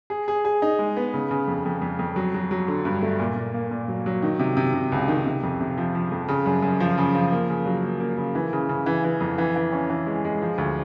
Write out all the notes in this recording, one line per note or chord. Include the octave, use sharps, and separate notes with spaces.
G#4
G#4
G#4
D#4
G#3
B3
C#3
C#3
F2
F2
F2
F2
F#3
F#3
F#3
D3
G2
A3
A#2
A#2
A#3
A#2
F#3
F#3
D#3
C3
C3
C3
C#2
D#3
C3
F2
C3
F3
F3
F2
C#3
F#2
F#2
F3
C#3
F3
A#3
C#3
F#3
A#3
A#3
C#3
E3
C#3
C#3
E3
E3
F2
E3
E3
C#4
E3
G#3
G#3
F3
D2